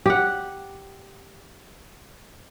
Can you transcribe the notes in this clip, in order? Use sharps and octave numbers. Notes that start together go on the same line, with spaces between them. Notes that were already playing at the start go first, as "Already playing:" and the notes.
G4 F#5